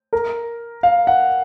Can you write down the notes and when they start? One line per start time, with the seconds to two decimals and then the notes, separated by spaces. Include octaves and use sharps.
0.13 A#4
0.83 F5
1.07 F#5